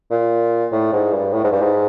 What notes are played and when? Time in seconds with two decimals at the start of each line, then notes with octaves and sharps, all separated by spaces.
0.11 A#2
0.72 A2
0.93 G#2
1.13 G2
1.34 A2
1.44 G#2
1.52 G2
1.62 G#2